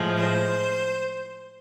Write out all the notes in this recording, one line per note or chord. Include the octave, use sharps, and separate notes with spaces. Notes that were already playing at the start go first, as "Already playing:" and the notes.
Already playing: A2 F3 G#3
C5